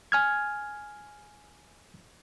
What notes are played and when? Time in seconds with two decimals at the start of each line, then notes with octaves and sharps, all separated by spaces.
0.12 G#5 F6 G#6